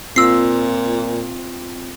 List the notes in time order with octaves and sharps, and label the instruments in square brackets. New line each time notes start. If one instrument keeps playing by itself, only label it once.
[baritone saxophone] A#2 [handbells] C4 F4 [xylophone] E6 C7